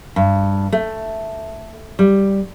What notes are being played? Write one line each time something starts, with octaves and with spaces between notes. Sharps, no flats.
G2
A3
G3